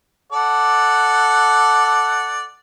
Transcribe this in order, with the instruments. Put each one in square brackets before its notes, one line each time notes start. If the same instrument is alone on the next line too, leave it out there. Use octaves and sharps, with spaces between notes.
[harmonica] A4 D5 F#5